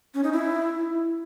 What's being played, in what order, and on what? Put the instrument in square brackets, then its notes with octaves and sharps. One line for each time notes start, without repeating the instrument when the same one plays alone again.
[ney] C#4
D#4
E4